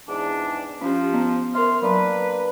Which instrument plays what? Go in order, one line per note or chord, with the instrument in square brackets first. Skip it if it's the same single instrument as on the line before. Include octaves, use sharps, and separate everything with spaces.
[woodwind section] E2 G#2 D4
[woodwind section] F3 [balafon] C#4 G4
[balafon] B3
[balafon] A#4 E5 [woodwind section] C6 F6
[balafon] F#3 [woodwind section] A#3 D4 B4